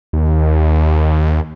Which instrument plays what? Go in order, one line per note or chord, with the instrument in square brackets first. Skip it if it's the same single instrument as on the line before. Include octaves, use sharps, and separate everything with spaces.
[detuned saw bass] D#2